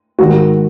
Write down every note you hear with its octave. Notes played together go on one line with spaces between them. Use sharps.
G#2 D#3 F#4